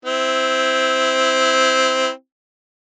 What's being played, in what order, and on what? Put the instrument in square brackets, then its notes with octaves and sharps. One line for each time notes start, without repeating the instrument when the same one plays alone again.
[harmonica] C4 E4